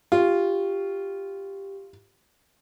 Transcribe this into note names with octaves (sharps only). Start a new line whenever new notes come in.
F4 G4